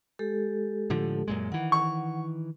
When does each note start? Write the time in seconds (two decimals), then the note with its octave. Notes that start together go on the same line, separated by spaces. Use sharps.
0.19 G#3 G4 A4
0.90 A2 D3 F3
1.28 F#2 A#2 G#3
1.52 D#3 E3 F#5
1.72 C#6